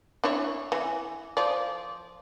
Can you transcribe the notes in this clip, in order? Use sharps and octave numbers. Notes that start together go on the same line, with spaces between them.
D4 E4 C#5
E3
F3 D5